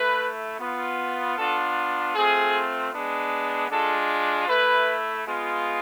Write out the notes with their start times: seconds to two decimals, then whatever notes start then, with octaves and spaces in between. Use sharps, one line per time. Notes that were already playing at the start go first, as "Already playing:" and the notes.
Already playing: A3 E4 B4
0.60 B3 F4
1.37 B3 D4 F4 A4
2.15 A3 C4 F4 G#4
2.93 G#3 B3 D4
3.71 G#3 D4 F4 A4
4.48 A3 E4 B4
5.26 G#3 B3 F4